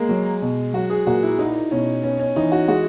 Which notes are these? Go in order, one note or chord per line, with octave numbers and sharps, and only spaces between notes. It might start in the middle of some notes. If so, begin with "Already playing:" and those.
Already playing: G#3 A#3
F#3
B2
F#3 F#4
G#4
A#2 F#4
E4
D#4 E4
B2 C#4
B3 C#4
C#4
E3 D#4
F#4
G#3 F#4